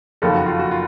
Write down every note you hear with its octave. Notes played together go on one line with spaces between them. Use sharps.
F#1 F2 D#3 A#3 A4
F#4
F4
F#4
F4